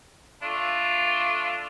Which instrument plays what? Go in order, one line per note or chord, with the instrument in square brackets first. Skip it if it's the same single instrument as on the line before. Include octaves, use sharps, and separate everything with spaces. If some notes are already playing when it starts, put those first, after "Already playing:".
[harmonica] A3 D4 F4